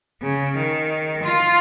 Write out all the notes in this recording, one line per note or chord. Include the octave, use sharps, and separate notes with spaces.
C#3
D#3
F4